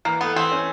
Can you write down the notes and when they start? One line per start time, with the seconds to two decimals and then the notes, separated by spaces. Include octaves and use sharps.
0.05 E3 A#3
0.21 A3 B3
0.36 E3 C4
0.52 C#4